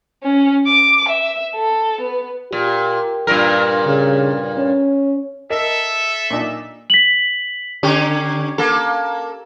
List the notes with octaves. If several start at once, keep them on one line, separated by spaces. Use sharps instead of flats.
C#4
D6
E5
A4
B3
A#2 G4
G2 A#2 A#4
C#3
C#4
A4 A#4 D#5 E5
A#2 D4 D#4
B6 F#7
D3 C#4 G4
A#3 A4